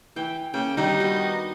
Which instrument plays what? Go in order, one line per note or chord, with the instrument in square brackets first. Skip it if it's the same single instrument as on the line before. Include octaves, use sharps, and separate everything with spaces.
[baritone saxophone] E3 [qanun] G5
[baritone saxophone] C#3 [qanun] A#3 [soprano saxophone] G5
[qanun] D#3 D4 [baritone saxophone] G3 [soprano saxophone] D#4
[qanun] B3 F#4